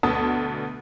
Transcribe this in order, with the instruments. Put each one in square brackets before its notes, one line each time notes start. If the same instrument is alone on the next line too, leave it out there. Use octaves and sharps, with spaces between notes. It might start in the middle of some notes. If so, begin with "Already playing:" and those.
[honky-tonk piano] D2 B2 D3 B3 A5 D#6